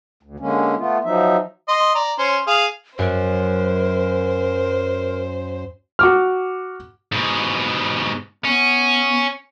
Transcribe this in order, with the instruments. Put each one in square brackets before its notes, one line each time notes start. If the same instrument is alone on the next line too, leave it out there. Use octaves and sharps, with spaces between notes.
[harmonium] D2
D3 G#3 A#3 C#4
A3 B3 F4
F3 F#3 D#4 E5
[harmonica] D#5 C6
D5 A#5
C#4 C5
G#4 F5
[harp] F#2 [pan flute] A#4 [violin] C5
[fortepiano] F#4 D6 F6
[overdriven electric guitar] G#2 B2
[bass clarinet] B3 [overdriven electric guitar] C#4